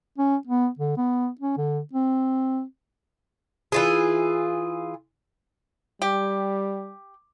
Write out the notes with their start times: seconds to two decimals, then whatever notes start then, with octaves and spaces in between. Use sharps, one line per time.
0.18 C#4
0.47 B3
0.79 D3
0.97 B3
1.41 C#4
1.57 D3
1.93 C4
3.72 E3 F4 G#4
6.02 G3 G4